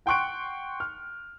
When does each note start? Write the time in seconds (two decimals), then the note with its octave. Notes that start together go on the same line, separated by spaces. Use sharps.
0.06 F#5 G5 C6 C#6 F#6 D7
0.80 F6